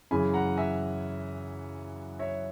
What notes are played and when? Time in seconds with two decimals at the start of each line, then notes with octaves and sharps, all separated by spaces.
0.11 F#2 C#3 E3 G#5 B5
0.33 F#5 A#5
0.57 E5 G#5
2.19 C#5 E5